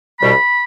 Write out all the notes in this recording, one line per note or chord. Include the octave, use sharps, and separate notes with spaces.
C2 B2 G3 B5